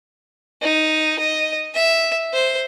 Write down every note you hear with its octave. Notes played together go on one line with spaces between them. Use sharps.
D#4
D#5
E5
C5